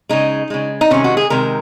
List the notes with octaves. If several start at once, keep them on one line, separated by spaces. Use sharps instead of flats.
C#3 G#3 D#4
C#3 G#3
D#4
C3 D#3 G#3 C#4
F#4
G#4
C3 D#3 G#3 A#4